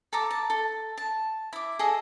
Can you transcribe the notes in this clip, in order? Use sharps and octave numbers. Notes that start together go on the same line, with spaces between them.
A4 A5 A#5 D6
A5
A4
A5
E4 D6
G#4 A4 D#5